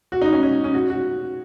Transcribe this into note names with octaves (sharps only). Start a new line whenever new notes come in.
F#4
D#4
C#4
C#4
C#4
F#4
F#4